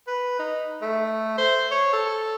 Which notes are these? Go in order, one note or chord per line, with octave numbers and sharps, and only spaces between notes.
B4
D#4
A3
C5
C#5
A4